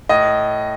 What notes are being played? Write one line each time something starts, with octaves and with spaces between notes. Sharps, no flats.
A2 D#5